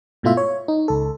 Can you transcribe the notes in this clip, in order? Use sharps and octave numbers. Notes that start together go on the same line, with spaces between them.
G#2 B2 A3 E4 F4 E5
C#5
D#4
C#2 A4